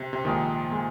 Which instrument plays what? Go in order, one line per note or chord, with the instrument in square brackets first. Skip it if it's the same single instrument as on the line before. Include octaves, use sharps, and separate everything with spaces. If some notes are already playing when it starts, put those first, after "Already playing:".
Already playing: [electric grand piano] C3
C3
[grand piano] A#1 A#2 G#3 D#4 A#4 [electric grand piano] D#3
[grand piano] A#2 G#3